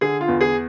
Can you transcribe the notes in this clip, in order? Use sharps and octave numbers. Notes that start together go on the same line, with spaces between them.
D3 G#4
F4
E2
G#4